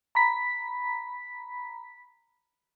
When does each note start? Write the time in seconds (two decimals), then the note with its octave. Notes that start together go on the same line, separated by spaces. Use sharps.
0.15 A#5 B5 B6